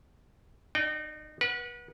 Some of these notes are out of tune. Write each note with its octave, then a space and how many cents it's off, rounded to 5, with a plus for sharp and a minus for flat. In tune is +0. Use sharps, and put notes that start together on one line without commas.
D#4 -30 D5 +0 G5 -25
B4 -35 F#5 +0